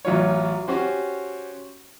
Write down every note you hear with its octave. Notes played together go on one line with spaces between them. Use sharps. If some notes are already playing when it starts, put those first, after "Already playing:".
A1 F#3 F4 C#5
C#4 F#4 G4 C5